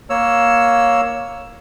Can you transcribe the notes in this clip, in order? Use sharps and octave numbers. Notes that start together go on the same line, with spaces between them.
A#3 C#5 E6